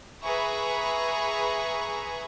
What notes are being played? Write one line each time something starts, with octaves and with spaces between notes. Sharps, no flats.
G#4 B4 E5 A#5 B5 C#6